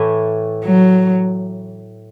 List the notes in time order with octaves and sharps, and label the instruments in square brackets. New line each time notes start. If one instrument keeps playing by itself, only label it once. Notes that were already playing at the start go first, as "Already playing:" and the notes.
Already playing: [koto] A2 E3 A3
[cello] F#3